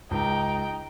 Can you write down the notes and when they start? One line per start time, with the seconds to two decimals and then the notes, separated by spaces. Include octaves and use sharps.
0.11 C#2 D#4 G5